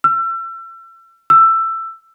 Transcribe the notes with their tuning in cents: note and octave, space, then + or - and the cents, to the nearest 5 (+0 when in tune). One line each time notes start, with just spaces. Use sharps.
E6 +35
E6 +15